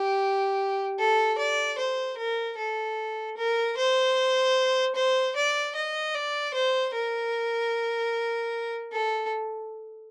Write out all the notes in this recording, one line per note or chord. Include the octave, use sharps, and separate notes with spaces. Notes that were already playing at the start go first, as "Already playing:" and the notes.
Already playing: G4
A4
D5
C5
A#4
A4
A#4
C5
C5
D5
D#5
D5
C5
A#4
A4